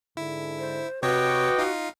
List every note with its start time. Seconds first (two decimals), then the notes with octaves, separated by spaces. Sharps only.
0.17 G#2 D3 E4
0.59 C5
1.03 C3 F#4 B4 C#5 D#5 G5 D6
1.58 D#4 F4 F5